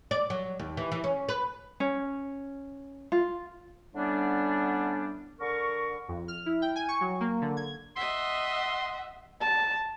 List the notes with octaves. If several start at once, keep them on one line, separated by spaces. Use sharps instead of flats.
D5
F#3
D#2
E3
E3
C#4
B4
C#4
F4
A2 D3 G3 B3 C#4 D4
D3 A#4 C#6
F2
F6
E4
G5
G#5
C#6
F#3
A#3
D3
G#6
D#5 E5 F#5 C6
A5